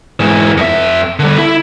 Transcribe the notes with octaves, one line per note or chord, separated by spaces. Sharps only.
G#2 E3
F2 E5
D3 G3
E4